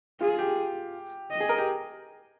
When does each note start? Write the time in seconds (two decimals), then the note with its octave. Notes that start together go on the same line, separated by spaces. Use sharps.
0.21 F4 G#4
0.38 G4
1.31 D#5
1.40 G#4
1.49 A#4
1.58 G4